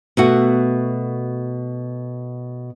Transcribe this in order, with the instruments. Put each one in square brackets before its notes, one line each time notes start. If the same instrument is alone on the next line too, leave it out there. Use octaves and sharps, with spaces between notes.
[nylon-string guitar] B2 A3 F#4